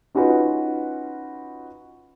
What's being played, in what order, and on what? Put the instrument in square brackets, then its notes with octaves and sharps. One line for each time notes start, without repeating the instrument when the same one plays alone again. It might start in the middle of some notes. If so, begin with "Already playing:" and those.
[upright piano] C#4 D#4 F4 F#4 B4